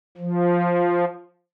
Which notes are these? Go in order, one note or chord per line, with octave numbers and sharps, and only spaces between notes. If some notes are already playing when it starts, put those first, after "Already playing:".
F3